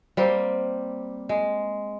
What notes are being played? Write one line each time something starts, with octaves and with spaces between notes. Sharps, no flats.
G3 A#3 C4
G#3